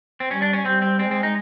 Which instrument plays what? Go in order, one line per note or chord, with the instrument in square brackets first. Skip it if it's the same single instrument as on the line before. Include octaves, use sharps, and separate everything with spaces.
[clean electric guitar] C4
[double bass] G3 [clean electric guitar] C#4
[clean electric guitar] D4
C#4
[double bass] G3 [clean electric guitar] C4
[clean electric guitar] C4
[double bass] G#3 [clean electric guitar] C4
[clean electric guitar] C4
D#4